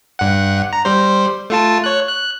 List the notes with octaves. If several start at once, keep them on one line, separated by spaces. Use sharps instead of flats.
G2 F#5
A#5
G3 C5
A3 F4 A5
C#5 F#6
F#6